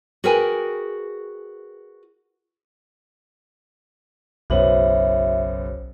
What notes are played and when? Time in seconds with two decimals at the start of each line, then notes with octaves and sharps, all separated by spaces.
0.24 F#4 G#4 A#4 B4 G5 G#5
4.50 F#1 B1 B3 F#4 C5 C#5 E5 F#7